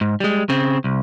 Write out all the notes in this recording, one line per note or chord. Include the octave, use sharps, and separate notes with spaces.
G#2
G3 G#3
C#3 C4
C2